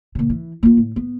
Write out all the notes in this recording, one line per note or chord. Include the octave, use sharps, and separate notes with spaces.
A#2 C#3
E3
A#3 F4
A2
B3